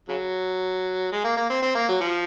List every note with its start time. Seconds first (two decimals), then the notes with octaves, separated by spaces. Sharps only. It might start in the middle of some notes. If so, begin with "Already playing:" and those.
0.08 C#3 F#3
1.12 G#3
1.24 A#3
1.37 A#3
1.50 C4
1.62 C4
1.75 A#3
1.89 F#3
2.01 F3